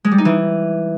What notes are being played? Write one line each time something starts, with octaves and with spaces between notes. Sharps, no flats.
G#3
G3
D#4
E3